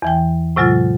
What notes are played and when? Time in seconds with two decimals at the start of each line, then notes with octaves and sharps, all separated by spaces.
0.02 E2 E3 G5
0.56 A2 C3 F#3 G#3 F4 A6